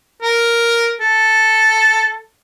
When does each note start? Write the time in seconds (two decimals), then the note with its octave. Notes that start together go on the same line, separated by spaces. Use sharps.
0.22 A#4
1.00 A4